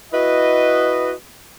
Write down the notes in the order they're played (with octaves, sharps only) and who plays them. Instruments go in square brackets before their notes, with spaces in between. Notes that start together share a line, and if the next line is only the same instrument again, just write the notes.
[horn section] E4 F#4 B4 D#5